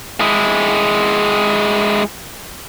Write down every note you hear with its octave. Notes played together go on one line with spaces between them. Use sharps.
G#3 E4